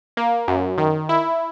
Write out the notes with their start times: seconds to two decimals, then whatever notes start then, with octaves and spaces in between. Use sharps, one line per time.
0.17 A#3
0.48 F#2
0.78 D#3
1.09 E4